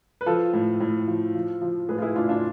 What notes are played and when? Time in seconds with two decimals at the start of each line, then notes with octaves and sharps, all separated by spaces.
0.21 B4
0.26 F3 F4 A4
0.53 A2
0.80 A2
1.08 F3
1.35 F3
1.62 F3
1.89 A2 G#4 B4
1.98 F4
2.02 E4 G#4
2.16 A2 D4 F4
2.29 D4 F4